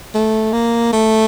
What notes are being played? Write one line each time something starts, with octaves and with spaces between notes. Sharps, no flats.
A3
A#3
A3